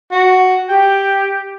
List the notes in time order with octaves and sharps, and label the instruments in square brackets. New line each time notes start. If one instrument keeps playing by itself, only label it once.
[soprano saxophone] F#4
[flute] G4 [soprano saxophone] G5